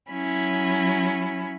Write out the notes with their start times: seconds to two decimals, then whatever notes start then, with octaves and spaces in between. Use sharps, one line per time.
0.10 F#3 C#4 E4